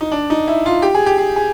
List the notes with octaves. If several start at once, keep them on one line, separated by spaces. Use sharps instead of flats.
D#4
D4
D#4
E4
F4
G4
G#4
G4
G#4
G#4